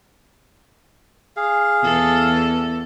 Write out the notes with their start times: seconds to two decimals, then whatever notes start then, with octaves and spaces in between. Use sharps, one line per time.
1.37 G#4 F5
1.82 E2 A4